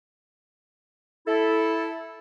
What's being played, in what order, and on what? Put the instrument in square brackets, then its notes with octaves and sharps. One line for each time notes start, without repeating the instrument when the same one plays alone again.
[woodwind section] E4 A4